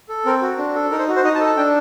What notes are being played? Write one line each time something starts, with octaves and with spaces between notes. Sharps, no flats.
A4
C4 A#4
F#4
D4
A4
D#4 A#4
C5
F#4
C5
D#4 D#5
A5
A4
A5
D4 G5